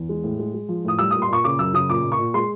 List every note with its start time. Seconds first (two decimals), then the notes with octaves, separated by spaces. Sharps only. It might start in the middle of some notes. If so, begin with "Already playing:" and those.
Already playing: E2
0.09 G#3
0.24 A2
0.39 G#3
0.54 G#3
0.69 F3
0.84 A2 D#6
0.98 G3 E6
1.11 A#2 D#6
1.22 C6
1.28 A#2 C#6
1.44 C#3 D6
1.59 F#2 E6
1.74 C#3 D#6
1.90 A#2 D6
2.04 A#2
2.12 C#6
2.19 A#2
2.34 G#3 C6